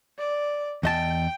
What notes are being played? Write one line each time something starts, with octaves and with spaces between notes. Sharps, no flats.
D5
E2 D#5 G5 A5